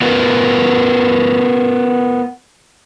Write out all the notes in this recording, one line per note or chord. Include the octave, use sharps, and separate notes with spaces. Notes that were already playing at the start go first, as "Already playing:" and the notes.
B3 F4 A#4 B4